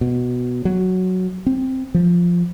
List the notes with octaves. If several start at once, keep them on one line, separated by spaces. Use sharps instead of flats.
B2
F#3
C4
F3